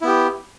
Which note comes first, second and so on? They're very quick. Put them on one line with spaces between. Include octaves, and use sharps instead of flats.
E4 B3 G4